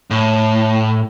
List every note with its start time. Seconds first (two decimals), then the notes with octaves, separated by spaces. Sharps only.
0.11 A2